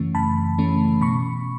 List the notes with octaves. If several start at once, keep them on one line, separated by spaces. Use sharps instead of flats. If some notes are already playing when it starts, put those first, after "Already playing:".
Already playing: F#2 C#3 E3 A3 C#4
F#2 A5 B5
C#3 E3 A3 C#4
B2 B5 C#6